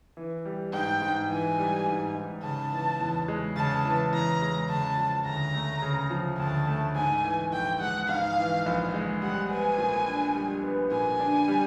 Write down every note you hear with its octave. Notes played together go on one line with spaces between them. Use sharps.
E3
G3
G#2 G5
G#2
E3 G#5
G3
G#2
G#2
C#3 A5
E3
E2
G#3
C#3 A5
E3
E2 A#5
G#3
C#3 A5
F3
D2 A#5
A3
C#3
F3
D2 A5
A3
G#2 G#5
E3
A#1 G5
G#3 F#5
G#2 F5
E3
A#1
G#3
G3 F#5
B3 G#5
A#2
D4
G3
B3
A#2 G#5
D4
G3